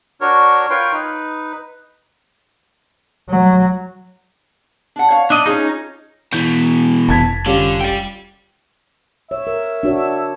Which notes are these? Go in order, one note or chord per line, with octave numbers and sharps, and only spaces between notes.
D4 F#4 A#4 C#5
F4 A#4 B4 C#5 G5 C6
D#4 B4
F#3
D4 F#5
C#5 F5
A3 D4 D#5
C#4 D#4 F4 G#4
B2 E3 G6
F1 A5 G#6 B6
D3 G3 C#4 F4
D5 G5
C#5 E5
A#4
D4 F#4 C#5